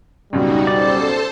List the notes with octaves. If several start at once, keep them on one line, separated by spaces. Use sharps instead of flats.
C#2 F#2 B2 G3 D#4 F#4
A4 C5 D5 A5